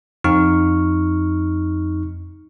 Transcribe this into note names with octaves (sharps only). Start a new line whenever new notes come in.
F2 D#4 C#6 F6